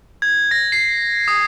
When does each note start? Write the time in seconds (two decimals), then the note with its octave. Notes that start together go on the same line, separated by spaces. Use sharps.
0.22 G#6
0.51 A#6
0.72 C7
1.28 D#6